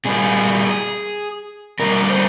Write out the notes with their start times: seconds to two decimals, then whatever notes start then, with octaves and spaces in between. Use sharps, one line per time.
0.05 A#2 G3 A#3 G#4
1.79 F2 D3 G3 A#3 A#4
2.09 C5